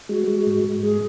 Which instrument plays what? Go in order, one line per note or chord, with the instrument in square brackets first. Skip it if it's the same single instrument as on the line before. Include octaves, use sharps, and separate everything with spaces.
[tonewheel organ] G#3 [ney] F#4
[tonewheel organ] G#3
G#2
G#2
[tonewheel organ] G#3 [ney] G#4